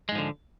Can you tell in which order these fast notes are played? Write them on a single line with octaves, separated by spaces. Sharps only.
G#3 G#2 F3 D3